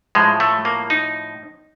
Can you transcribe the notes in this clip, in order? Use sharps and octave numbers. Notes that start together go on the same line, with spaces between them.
A2 F3 G#3
A3
A#3
D#4